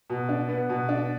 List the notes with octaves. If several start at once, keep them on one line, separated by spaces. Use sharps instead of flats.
B2
D4
B3
B2
D4